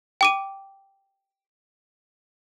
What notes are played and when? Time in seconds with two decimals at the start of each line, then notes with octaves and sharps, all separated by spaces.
0.21 G5 D6 D#7